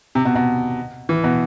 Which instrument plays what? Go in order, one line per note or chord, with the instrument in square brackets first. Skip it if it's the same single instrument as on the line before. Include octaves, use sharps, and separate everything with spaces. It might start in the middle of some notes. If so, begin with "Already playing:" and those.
[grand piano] C3
B2
B2
E3
B2